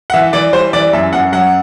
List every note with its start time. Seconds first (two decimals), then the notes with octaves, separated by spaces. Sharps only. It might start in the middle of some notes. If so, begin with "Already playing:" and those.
0.10 F#5
0.13 E3 E5
0.33 E3 D5
0.53 G3 C5
0.73 E3 D5
0.93 F#2 E5
1.13 F#2 F#5
1.32 F#3 F#5